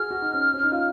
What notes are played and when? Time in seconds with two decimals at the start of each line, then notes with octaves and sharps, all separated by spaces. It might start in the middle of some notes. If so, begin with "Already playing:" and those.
Already playing: F#4 G#4 F6
0.11 F#4
0.22 D#4
0.33 C#4
0.54 C#4
0.63 D#4
0.72 F4